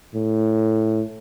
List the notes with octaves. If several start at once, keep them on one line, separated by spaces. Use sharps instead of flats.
A2